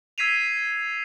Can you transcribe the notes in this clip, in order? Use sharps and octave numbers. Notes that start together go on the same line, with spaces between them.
E6 G#6 B6 C7 D#7 F7